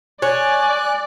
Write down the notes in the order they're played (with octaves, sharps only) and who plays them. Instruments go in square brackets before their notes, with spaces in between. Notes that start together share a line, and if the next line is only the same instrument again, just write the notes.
[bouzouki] C#5 [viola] D5 [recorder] G#5 [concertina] F#6